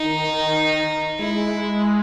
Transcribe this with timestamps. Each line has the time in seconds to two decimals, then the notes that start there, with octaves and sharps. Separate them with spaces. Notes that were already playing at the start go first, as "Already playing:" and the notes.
Already playing: D#3 D#4
1.19 G#3 E4